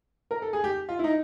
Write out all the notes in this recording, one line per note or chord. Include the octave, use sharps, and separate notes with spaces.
A#4
A4
G#4
G4
F4
E4
D#4